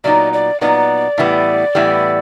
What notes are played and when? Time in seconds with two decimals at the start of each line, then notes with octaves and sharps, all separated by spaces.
0.04 A#2 F#3 B3 D#4 D5
0.33 D5
0.61 A#2 F#3 B3 D#4 D5
1.18 A2 E3 G3 B3
1.75 A2 E3 G3 B3